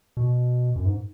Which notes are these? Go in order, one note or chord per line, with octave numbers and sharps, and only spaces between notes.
B2
F#2
G#2